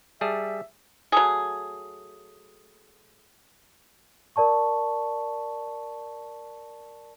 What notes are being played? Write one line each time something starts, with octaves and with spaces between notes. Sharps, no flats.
G3 G#4 E5 A5
F#3 A3 G#4
A#4 D5 A5 C#6